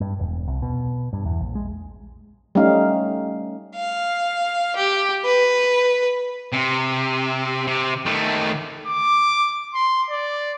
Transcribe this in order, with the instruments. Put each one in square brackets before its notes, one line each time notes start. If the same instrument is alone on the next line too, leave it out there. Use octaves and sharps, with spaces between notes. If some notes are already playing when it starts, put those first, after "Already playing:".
[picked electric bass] G2
E1
C2
B2
G2
E2
A#1
G#3
[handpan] G3 A3 C#4 D#4 F5
[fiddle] F5
G4
B4
[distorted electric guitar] C3
C3
D#3 A3
[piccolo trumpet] D6
C6
D5